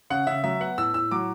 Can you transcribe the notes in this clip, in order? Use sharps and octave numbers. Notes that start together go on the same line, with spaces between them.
C#3 F#5
C#3 E5
F#3 E5
B3 F#5
A2 E6
A2 E6
F#3 D6